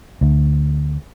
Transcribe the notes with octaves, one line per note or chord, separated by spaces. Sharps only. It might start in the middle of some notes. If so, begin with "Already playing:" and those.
D2 D3